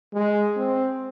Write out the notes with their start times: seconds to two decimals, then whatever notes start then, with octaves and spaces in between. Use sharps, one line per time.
0.13 G#3
0.56 C4